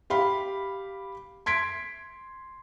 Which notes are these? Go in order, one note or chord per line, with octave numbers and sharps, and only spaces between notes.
G4 F5 B5
C6 G#6 B6 D7